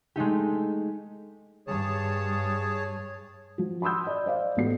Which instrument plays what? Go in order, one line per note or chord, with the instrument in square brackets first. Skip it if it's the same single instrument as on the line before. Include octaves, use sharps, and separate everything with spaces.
[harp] G#3 A3 D#4 G4
[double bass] G2 [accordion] G#4 C#5 A5
[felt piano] F3 F#4
B5 C6 D#6 E6 G6
D5
C5 D5 F5
A1 A3 B3 F#4 C7